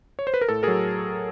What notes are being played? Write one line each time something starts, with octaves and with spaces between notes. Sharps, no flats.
C#5
C5
B4
A#4
A2 A4
F#3 G#4 A#4